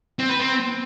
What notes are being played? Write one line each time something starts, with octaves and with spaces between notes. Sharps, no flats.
C4
B4
C4